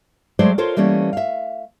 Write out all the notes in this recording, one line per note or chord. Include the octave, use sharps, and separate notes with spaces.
F#3 G#3 A3 C5 D5
F4 A4 A#4 C5 C#5
E3 G3 A3 A#3 C#4
E5 F5